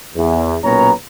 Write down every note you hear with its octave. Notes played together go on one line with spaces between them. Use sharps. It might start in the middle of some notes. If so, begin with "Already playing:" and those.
E2
B1 A#2 B3 C#4 C#5 A#5